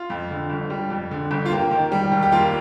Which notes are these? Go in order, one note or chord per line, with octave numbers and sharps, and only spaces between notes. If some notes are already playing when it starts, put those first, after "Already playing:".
Already playing: F4
F2
D3
G1
G3
F2
D3
G1
F4
A#3 G4
D#3
G3
D#2
G4
A#3 F4